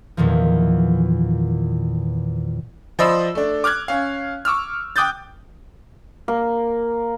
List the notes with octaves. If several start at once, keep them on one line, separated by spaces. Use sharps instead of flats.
E2 A#2 D#3 F3
F3 C5 D5 D#5 B5 E6
A3 D4
D6 F6 F#6 G#6
C#4 F5
C#6 D6 E6 F6
G5 D6 D#6 F#6 G6 A6
A#3